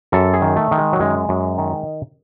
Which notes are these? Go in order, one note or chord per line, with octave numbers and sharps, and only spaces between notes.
F#2 A4
G#4
D#3
A3
D#3
G#3
F#3
F#2 G#3
F#2
D#3